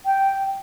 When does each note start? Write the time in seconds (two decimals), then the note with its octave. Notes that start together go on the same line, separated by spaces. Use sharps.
0.06 G5